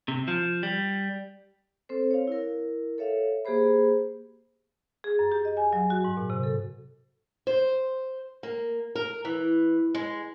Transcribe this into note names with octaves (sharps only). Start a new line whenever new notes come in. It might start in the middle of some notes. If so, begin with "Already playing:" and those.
C3
F3
G3
C4 A4 C5
C#5 F5
E4 A#4
A4 C#5 E5 F5
A#3 G4 G#4 C5 B5
G#4
F#2
G4
D#5
G#5
F#3
F#4
G#2
A#2
C3
A4
C5
A#3
A#4
E3
G#3